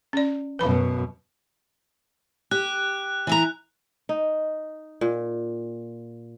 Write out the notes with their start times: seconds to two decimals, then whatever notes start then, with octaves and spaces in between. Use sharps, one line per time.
0.13 C#4 D5
0.59 F#2 B2 B4 B5
2.51 G4 F#6
3.27 E3 E4 A#5
4.09 D#4
5.01 A#2